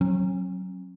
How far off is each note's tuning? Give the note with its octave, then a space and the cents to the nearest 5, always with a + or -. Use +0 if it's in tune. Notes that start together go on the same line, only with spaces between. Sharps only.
F#3 +0 C#4 -40